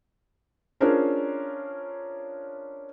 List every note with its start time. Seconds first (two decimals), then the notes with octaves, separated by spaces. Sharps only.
0.81 C#4 D4 F4 G#4 A#4 C5